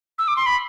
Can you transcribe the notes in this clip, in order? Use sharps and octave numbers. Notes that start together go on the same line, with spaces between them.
E6
D6
C6
B5